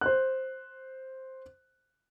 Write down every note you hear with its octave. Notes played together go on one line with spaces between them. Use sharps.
C5 F#6